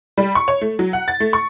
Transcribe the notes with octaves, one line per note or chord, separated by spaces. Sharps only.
G3
C#6
C#5
A3
F#3
F#5
A6
A3
C#6